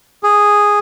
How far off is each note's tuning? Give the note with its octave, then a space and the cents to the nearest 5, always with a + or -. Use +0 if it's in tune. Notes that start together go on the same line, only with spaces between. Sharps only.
G#4 -5